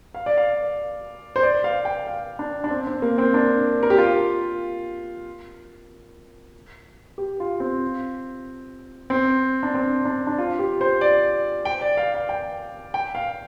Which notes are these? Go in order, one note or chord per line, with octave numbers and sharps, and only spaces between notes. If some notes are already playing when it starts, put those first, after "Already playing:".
F5
D5
F5
C5
D5
F5
G5
F5
D4
D4
C4
C4
A#3
C4
D4
A#4
G4
F4
G4
F4
C4
C4
D4
C4
D4
D4
F4
G4
C5
D5
G5
D5
F5
F5
G5
G5
F5